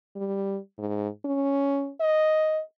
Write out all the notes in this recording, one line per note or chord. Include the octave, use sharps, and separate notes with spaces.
G3
G#2
C#4
D#5